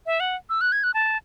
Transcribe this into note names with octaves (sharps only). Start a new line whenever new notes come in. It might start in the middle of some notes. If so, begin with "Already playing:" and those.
E5
F#5
E6
F#6
G#6
F#6
A5